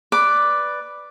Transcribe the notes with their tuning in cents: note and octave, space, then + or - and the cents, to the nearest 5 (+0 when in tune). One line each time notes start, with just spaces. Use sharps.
B4 +0 D5 +0 D6 +0